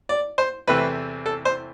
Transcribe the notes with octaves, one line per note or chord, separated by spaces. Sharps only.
D5
C5
E2 C3 E3 A3 C4 B4
A4
C5